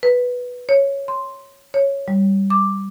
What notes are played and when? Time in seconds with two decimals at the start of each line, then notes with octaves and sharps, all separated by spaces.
0.03 B4
0.69 C#5
1.08 C6
1.74 C#5
2.08 G3
2.50 D6